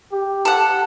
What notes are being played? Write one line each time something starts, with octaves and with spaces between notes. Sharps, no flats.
G4
A4 F#5